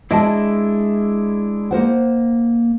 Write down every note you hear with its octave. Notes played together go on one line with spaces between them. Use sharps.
G#3 D4 E4 D#5 A5
A#3 C5 F#5